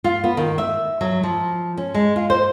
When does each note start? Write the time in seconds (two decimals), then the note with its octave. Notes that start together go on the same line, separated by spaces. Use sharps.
0.04 F4
0.24 B3
0.37 D#3
0.58 E5
1.01 F#3
1.23 F3
1.77 C#4
1.94 G#3
2.16 F4
2.30 C5